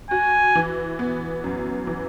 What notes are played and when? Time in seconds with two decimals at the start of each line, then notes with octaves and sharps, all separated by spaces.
0.11 F#4 G#5
0.55 E3
0.99 B3
1.44 F#2
1.87 E3